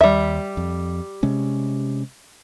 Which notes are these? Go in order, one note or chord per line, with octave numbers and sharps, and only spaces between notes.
D#2 G3 E5
F2
C3 G#3 C#4